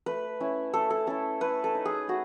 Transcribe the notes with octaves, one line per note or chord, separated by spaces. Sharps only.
A3 B4
C#4 E4
A3 A4
A4
C#4 E4 A4
A3 B4
A4
D#4
G#4
A3 F#4